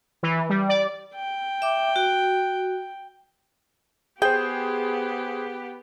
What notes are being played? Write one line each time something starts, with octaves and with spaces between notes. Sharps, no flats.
E3
G3
D5
G5
E5 D6
F#4
B3 G4 G#4 C5 G5